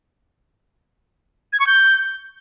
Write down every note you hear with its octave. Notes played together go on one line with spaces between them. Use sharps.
G#6
C#6
G6